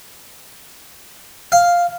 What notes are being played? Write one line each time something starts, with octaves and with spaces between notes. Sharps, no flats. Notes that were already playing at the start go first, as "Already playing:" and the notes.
F5